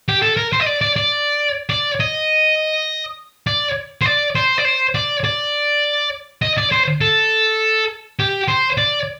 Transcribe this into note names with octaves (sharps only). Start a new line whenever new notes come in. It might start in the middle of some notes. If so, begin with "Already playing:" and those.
G4
A4
A#4
C5
D#5
D5
D5
D5
D5
D#5
D5
C5
D5
C5
D5
C5
D5
D5
D#5
D5
C5
A4
G4
C5
D5